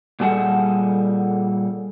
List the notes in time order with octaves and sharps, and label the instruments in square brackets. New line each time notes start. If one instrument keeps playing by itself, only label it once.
[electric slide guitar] A#2 G3 G#4 A4 F#5